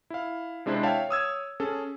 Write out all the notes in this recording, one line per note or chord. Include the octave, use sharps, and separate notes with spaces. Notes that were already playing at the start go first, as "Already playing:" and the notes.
E4 F5
C3 G#3 D4 E4 C5
C#5 E5 F5 G5 A5
C#5 D#6 E6 G#6
C#4 G#4 A4